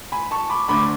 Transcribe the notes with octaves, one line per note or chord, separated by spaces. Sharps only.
G#5 B5
A5 C#6
B5 D6
D2 D3 A3 B5 D6